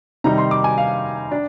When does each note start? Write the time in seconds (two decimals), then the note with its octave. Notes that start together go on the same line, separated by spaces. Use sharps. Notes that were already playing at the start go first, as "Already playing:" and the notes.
0.24 C3 D#3 G3 C4 D#4 A#5
0.38 C6
0.51 D6
0.64 G#5
0.78 F5
1.31 D4